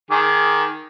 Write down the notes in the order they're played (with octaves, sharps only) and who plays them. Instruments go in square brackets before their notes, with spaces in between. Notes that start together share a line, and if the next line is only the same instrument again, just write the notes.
[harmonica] D#3 G#4 D6